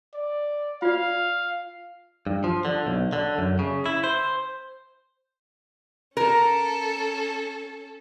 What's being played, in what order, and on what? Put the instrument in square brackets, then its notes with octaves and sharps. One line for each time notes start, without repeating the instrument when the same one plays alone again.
[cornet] D5
[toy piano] F4 D5 [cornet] F5
[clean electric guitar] G2
F3
D3
B1
D3
F#2
C#3
E4
C5
[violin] C#4 A4 [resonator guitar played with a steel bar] A#4